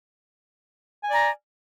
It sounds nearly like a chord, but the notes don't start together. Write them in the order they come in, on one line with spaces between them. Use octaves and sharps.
G#5 D5 A#5